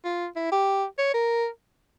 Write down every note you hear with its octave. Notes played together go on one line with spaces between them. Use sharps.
F4
E4
G4
C#5
A#4